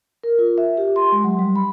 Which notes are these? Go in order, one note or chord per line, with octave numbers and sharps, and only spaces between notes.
A#4
F4
E5
G4
C6
G#3
F#3
G3
B5